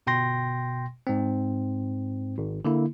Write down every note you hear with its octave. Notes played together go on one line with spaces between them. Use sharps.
G1 B2 G5 C6 A#6
G#2 C4
G#1
D3 A#3 E4